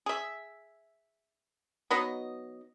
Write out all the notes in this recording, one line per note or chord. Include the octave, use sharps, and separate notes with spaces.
G#4 E5
F#3 B3 D#4 D#5